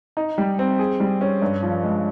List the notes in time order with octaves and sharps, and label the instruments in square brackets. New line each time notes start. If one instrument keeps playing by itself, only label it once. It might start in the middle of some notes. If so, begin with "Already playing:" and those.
[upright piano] D#4
G3
C4
G#4
G3
C#4
G2
F3
G#3